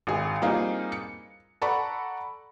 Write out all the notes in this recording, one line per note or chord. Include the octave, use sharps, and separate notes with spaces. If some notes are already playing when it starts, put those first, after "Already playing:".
G#1 G#4
G3 A#3 C4 D#4 F4 G#4
C#7
A4 D5 F#5 A#5 B5 C#6